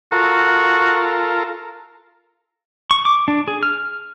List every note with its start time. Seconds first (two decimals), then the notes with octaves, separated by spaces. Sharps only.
0.12 F4 F#4 A4 A#4
2.91 C#6
3.05 D6
3.28 D4
3.48 G#4
3.63 F6